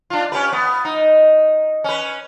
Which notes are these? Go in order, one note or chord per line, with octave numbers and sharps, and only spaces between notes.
D4 F4
C#4 G4 B4
B3
D#4
C#4 B4